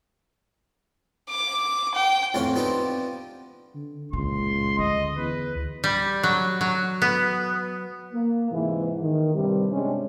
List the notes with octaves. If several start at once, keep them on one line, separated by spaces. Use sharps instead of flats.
D6
G5
A1 F2 C#4 F5 F#5
F3 B3 C4 D4 D#4 G4
D3
C#2 A#2 C6
D2 D#5
E2 B4
G3
F#3
F#3
B3
A#3
G#2 C3 E3
D#3
G2 C3 G3
C3 G#3 C#4 D4 G4